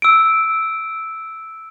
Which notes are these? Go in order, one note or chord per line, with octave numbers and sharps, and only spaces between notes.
E6 D7